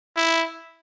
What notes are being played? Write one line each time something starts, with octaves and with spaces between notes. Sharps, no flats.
E4